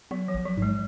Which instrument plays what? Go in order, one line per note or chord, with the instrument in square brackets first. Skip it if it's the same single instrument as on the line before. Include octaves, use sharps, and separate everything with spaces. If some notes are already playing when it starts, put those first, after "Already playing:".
[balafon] F#3 [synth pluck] B3
[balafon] F3
[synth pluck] A1
[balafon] F#3
[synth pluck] G#2 [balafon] G#3